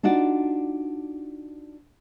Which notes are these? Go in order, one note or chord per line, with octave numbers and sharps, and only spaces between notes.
D4 D#4 F4 F#4 D5